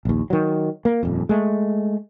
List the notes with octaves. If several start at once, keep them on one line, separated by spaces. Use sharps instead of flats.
A#1 D#2
D#3 F#3
A#3
D#1 F2
G#3 A3